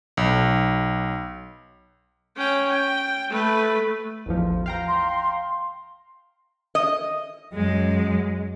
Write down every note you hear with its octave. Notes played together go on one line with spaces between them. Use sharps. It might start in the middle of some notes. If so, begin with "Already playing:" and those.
B1
C#4 G5
G5
A3 B4
A1 E2 F3
F5 G5 A#5
C6
D#5
F#2 G#3